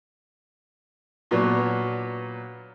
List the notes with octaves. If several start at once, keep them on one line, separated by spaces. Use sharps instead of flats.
A#2 F#3 B3 D4 C#5